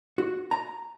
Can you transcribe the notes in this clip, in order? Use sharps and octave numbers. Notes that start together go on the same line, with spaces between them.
F#4
A#5